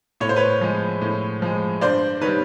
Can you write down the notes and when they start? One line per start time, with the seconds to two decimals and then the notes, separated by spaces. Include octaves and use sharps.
0.20 A2 C#5
0.29 C5
0.36 B4 C#5
0.61 F3 G#3
1.01 A2
1.42 F3 G#3
1.81 G2 C5 D5
2.21 D#3 G3 B4 C#5